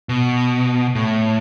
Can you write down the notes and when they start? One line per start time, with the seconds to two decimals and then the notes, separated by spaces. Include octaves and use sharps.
0.09 B2
0.95 A2